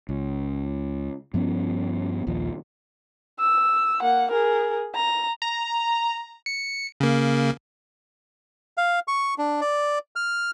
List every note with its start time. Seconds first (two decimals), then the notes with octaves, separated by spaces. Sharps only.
0.09 C#2
1.34 G2 F3 B3 C#4
2.27 A#1 D#2 F3
3.40 E6
4.01 A#3 F#5
4.32 G#4 A#4
4.95 A#5
5.42 A#5
6.46 C#7
7.00 C#3 A#3
8.77 F5
9.08 C#6
9.38 D4
9.61 D5
10.16 F6